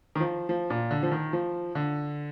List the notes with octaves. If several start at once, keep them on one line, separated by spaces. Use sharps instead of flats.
D#3
F3
F3
A#2
D3
F3
D#3
F3
D3